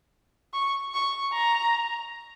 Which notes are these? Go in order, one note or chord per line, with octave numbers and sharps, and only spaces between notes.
C#6
C#6
A#5